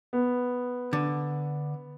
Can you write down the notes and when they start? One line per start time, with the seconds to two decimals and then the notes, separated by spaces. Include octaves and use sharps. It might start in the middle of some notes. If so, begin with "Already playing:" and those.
0.13 B3
0.93 D3